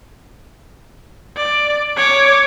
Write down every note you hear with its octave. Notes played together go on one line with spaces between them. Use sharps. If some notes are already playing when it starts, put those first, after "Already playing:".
D5
C#5 D6